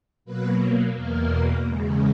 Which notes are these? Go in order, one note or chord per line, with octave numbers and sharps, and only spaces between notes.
B2 F#3 A#3 B4
E2 B2 A#3 A#4
E2 C#3 G#3